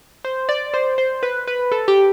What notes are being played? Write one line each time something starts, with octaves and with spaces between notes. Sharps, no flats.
C5
D5
C5
C5
B4
B4
A4
G4